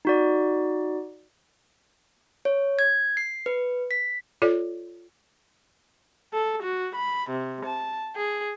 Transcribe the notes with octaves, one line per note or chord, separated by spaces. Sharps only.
D#4 F#4 D5
C#5
G#6
C7
B4
B6
F4 A4 C#5 D5
A4
F#4
B5
C3
A5
G#4